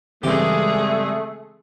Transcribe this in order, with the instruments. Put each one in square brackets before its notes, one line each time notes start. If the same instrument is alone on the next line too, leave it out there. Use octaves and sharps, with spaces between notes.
[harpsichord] G2 G4 [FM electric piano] C#3 E3 C4 [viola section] G#3 G#4 [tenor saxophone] A3